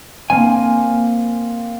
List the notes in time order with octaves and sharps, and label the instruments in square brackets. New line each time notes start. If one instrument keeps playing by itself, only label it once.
[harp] A#3 C4 [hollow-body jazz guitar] G#5